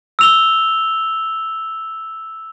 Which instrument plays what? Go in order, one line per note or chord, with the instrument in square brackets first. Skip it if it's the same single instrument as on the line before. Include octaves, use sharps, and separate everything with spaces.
[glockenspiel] E6 F7 G7